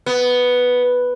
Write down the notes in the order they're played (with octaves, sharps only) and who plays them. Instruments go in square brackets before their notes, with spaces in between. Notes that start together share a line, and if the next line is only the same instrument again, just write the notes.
[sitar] B3